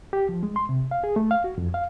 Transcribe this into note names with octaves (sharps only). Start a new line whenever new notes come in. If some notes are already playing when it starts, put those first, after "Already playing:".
G4
F3
G#3
C6
C3
F5
G#4
A3
F5
F#4
F2
F5